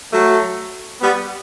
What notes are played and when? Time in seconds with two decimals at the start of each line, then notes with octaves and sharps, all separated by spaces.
0.12 F#3 A3
1.01 G3 B3